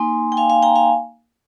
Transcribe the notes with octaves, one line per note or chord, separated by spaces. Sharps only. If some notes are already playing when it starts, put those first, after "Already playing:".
Already playing: A#3 D#4 G#5 C6
G5
F5 G#5
F5 G#5
G5 A#5
F5 G#5